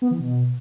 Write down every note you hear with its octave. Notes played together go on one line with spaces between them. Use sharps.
B3
E3
B2